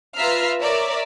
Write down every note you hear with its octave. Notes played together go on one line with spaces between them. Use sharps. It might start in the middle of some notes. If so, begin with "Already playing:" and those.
F4 B4 E5 A#5 F6 C7
A#4 C#5 D5 E5